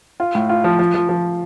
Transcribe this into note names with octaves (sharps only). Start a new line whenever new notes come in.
F4
A2
F4
F3
F3
F3
F3